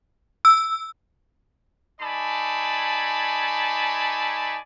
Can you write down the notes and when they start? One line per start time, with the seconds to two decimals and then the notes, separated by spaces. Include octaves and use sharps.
0.45 E6
2.01 A3 D#4 D5 G#5 A5 B5